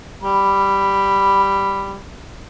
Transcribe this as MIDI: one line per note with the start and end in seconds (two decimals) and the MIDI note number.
0.22 1.97 55
0.22 1.97 83